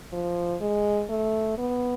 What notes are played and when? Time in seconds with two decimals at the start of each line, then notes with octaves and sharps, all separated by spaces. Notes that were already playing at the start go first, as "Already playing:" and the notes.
0.13 F3
0.61 G#3
1.10 A3
1.58 B3